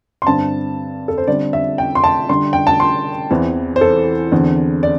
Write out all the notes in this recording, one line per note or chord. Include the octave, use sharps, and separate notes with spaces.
C6
G2 D3 C4 A5
A4
C5
D3 G3 C4 D5
E5
G5
C6
A5
D3 G3 D4 C6
G5
A5
C6
E2 E3 C4
C5
A4
E2 D3 C4
D5